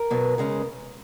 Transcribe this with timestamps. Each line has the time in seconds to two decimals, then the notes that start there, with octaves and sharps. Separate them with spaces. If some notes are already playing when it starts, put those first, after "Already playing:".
Already playing: A#4
0.10 B2 F#3 B3
0.38 C#3 G#3 C#4